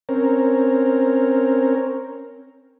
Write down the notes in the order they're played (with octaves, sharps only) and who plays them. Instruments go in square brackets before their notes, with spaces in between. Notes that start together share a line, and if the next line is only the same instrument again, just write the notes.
[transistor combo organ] C4 C#4 A#4